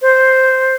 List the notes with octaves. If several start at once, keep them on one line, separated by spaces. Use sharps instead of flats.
C5